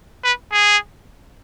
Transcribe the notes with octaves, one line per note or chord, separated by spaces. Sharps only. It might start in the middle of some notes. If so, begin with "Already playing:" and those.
B4
G#4